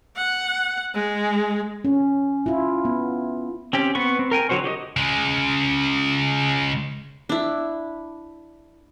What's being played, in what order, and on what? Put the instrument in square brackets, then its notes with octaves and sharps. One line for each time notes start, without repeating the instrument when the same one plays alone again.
[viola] F#5
G#3
[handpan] C#4
E4 F4
B3
[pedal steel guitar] C4 C#4 G4
B3 C4 B4 C#6
C4
A#4 G5 G#5
D3 F#3 F#4 C5 C#5
F#4 G4 D5 D#5
[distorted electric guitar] C#3 G#3
[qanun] D4 E4